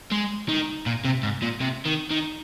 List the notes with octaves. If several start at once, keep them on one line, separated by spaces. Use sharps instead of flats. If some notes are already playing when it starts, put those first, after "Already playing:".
G#3
D#3
A#2
C3
G#2
A#2
C3
D#3
D#3